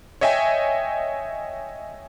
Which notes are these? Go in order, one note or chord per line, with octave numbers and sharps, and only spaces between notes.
C#5 D#5 E5 G5 G#5